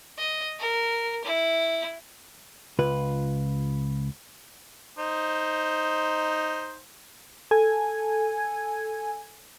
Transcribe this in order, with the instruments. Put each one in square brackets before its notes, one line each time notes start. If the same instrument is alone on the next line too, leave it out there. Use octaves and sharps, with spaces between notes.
[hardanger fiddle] D#5
A#4
E4
[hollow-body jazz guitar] C#2 F4 B4
[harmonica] D#4 C5
[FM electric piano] A4 G#5 G#6